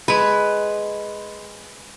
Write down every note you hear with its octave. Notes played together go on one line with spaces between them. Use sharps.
G#3 B4